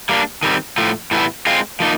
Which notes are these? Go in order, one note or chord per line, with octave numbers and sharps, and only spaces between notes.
G3 A#3 D4
D#3 G3 C4
A2 F3 A3
A2 E3 G3 B3 E4
G#3 C4 F4
F3 A#3 D#4